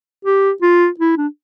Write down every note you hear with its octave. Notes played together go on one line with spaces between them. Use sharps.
G4
F4
E4
D4